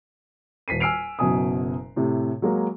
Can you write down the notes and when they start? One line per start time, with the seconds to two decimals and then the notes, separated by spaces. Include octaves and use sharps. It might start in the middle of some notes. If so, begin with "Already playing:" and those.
0.68 D#1 B6 C7 D#7
0.80 G#5 E6 F6 C7 D7 F7
1.19 F#1 F#2 B2 G#5 D#6
1.96 A2 C3
2.42 F#3 G#3 A#3